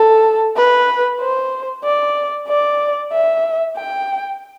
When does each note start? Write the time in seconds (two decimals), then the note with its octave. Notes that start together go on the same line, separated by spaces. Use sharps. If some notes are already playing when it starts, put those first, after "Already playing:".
Already playing: A4
0.56 B4
1.20 C5
1.84 D5
2.48 D5
3.12 E5
3.76 G5